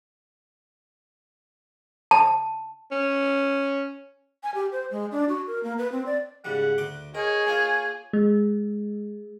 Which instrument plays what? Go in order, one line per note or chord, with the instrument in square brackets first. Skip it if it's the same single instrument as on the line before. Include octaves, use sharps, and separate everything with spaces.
[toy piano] A5
[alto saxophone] C#4
[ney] G#5
G4
C5
G#3
D4
F#4
A#4
A#3
B4
C4
D5
[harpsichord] G#2 C#3 G3 [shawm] F#5
[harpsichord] D2 C6 D6
[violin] G#4 [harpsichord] A#4 [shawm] C#5 [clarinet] D#5
[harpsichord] A#3 F4 F5 [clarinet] G#5
[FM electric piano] G#3